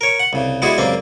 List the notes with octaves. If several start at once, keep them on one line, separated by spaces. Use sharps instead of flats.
A#4 C#5
F#5
C2 C#3
G3 G#3 B3 E4 F#4 G#4
C#2 F#2 G3 A#3 C4